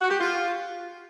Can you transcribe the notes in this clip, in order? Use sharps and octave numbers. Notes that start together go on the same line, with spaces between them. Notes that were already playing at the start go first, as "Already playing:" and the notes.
F#4
G4
F4